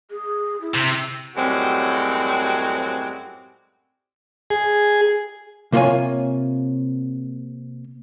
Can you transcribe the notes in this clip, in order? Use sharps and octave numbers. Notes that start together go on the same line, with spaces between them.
G#4
E4
C3
F#2 A2 G3 G#3 C4 F#4
G#4
C3 A#3 F4 G4 C#5 G#5